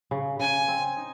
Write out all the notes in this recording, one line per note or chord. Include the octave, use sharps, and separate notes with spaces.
C#3
C#3 G#5
C4
D#4